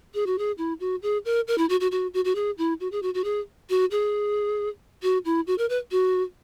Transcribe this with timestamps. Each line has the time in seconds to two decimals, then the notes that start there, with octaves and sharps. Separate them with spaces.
0.14 G#4
0.26 F#4
0.38 G#4
0.58 E4
0.80 F#4
1.02 G#4
1.25 A#4
1.48 A#4
1.58 E4
1.69 F#4
1.80 F#4
1.92 F#4
2.14 F#4
2.25 F#4
2.35 G#4
2.58 E4
2.80 F#4
2.92 G#4
3.03 F#4
3.14 F#4
3.24 G#4
3.70 F#4
3.91 G#4
5.03 F#4
5.25 E4
5.47 F#4
5.58 A#4
5.70 B4
5.91 F#4